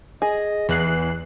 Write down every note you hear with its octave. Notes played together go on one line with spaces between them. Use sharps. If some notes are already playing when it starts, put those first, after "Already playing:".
G#4 D#5
E2 E3 F#6 C7